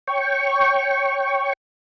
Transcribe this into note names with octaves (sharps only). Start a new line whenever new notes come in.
C#5 G5 C#6